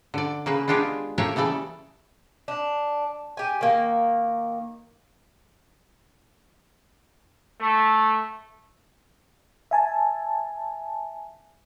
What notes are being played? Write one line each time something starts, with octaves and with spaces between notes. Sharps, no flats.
D3 D5
C#3 A#3 B4
G#3 B3 D4 F4 G4 G#4
A3 A#3 G4 C#5 E5 G#5
C#3 E3 G3 A4 D5
D4
G4 G#5
D#3 A#3
A3
E5 G#5 A5